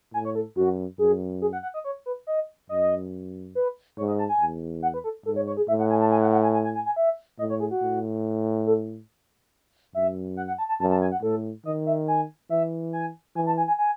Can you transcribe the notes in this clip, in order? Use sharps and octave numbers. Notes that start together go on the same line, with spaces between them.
A2 G#5
C#5
A4
F#2 F#4
F#2 G#4
G#4
F#5
F#5
D#5
C#5
B4
D#5
F#2 D#5
B4
G#2 C#5
D#5
A5
G#5
E2
F#5
B4
A4
G#2 A4
C#5
C#5
G#4
A2 E5
F#5
G#5
A5
G#5
F#5
F#5
G#5
G#5
G#5
G#5
G#5
E5
A2 D#5
C#5
G#4
F#4
A2
A4
F#2 E5
F#5
F#5
A5
A5
F#2 A5
A5
G#5
F#5
A2 A4
D#3 D#5
E5
G#5
E3 E5
G#5
E3 G#5
A5
G#5
G#5
G#5